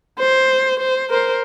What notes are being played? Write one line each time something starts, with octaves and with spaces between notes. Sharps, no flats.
C5
C5
A#4 C5